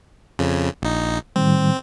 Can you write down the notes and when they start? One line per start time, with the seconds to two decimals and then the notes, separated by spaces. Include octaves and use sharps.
0.39 F2 C#3
0.82 A#1 D#4
1.36 A2 D#3 G3 C4